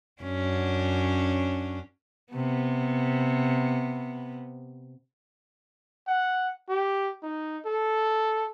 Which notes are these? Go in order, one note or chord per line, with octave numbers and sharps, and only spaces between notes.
F#2 C#4 D4
C3 B3
F#5
G4
D#4
A4